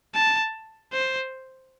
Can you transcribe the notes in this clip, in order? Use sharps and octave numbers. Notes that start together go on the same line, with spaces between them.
A5
C5